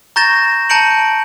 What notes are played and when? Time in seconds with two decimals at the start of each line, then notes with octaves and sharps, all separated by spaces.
0.16 A#5 C#6 G6 A6 A#6 E7
0.69 A5 A#5 G6 C#7 D7 F#7